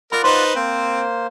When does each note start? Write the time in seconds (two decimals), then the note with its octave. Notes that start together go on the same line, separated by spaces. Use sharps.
0.12 F4 A#4 D5 F#5 B5 D#6
0.24 D#4 B4 C5 C6
0.55 A#3 C4 C5